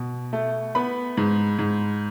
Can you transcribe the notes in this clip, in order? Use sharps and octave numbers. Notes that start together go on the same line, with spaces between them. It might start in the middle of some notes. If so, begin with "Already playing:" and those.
Already playing: B2
A3
B3 B5
G#2
G#2